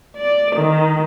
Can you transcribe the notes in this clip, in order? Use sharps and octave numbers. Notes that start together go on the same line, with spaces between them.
D5
D#3